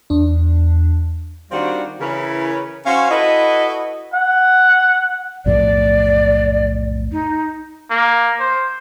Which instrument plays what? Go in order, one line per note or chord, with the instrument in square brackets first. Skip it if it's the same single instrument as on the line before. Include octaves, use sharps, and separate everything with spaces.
[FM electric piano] E2 D4
[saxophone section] D#3 G3 C4 D4 F4 F#4
C#3 E3 C#4 E4 A#4 B4
C#4 F#4 C5 F5
E4 F#4 A4 B4 D#5
[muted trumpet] F#5
[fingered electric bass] B1 F2 A2 [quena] D5
[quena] D#4
[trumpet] A#3
C5